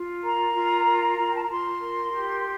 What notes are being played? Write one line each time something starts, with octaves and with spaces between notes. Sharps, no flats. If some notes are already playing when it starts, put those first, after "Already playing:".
Already playing: F4
A#4 A#5
F4
A#4
F4
G5
A5
A#5
F4 C6
A#4
G4